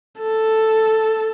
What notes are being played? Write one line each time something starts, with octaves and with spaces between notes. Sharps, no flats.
A4